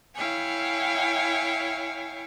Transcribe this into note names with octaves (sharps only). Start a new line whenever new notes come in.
E4 C#5 F5 G5 G#5